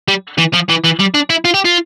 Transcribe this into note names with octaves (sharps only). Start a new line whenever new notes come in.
G3
E3
F3
E3
E3
G3
D4
E4
F4
G4
F4